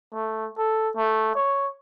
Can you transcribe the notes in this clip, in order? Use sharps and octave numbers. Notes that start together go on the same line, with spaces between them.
A3
A4
A3
C#5